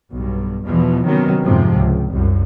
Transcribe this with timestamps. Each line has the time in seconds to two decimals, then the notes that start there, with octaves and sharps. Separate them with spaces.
0.11 B1 G2
0.64 E2 B2 E3 F3
1.05 C3 D#3 F#3 B3 C#4
1.43 F2 G#2 C3 F3
1.75 C#2
2.11 C2 F#2